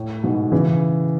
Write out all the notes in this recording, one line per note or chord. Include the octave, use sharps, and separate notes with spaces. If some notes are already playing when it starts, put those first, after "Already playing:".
Already playing: A2
G#2 B2
C#3 E3